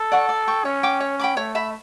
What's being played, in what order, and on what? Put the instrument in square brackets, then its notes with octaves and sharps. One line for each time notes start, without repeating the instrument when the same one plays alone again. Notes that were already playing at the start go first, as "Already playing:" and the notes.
Already playing: [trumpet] A4
[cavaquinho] D5 F#5 C#6
D5
G5 C#6
[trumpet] C#4 [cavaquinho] C#5
[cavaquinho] G5 D6
C#5
G5 B5 D6
[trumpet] A3 [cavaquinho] C#5
[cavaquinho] E5 B5